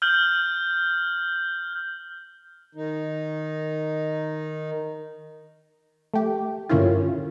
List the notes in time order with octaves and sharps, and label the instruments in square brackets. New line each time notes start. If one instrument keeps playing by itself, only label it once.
[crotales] F6 G6 F#7
[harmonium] D#3 D#4
[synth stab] A3 G4
G2 D3 A#3 C#4 E4 F4